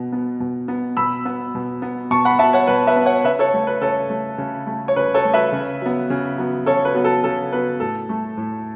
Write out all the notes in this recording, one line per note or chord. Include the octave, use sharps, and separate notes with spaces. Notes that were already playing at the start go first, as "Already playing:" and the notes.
Already playing: B2 B3
B3
B2
B3
B2 B5 E6
B3
B2
B3
B2 A5 C#6
F#5 B5
B3 E5 A5
C#5 F#5
B2 B4
B4 E5
B3
C#5 F#5
C#3 B4 E5
A4 C#5
A3
B4
C#3 A4 C#5
A3
C#3
A3
C#5
C#3 B4
A4 C#5
A3
B4 E5
C#3
F#3 B3
C#3
F#3 B3
C#3 A4 C#5
B4
F#3 B3
A4
C#3 A4
F#3 B3 B4
A2 A4
A3
A2